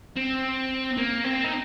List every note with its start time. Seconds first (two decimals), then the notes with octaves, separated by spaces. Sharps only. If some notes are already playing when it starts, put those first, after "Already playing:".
0.16 C4
0.97 A#3
1.24 C4
1.44 D#4